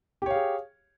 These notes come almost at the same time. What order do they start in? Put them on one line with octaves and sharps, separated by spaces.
G4 C#5 F5 G#4